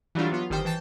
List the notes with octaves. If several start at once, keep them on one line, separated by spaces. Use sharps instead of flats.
E3 F#3 G3 A3 D4 F4
F#3 B3 F4
G1 D#3 G3 C5 G5 G6
E3 G5 A5